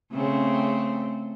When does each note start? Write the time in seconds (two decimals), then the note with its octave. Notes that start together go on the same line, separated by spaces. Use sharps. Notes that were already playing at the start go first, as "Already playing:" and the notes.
0.12 C#3 A3 C4